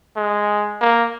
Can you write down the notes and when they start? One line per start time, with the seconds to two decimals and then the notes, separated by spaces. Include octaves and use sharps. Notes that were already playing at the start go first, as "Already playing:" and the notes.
0.17 G#3
0.81 A#3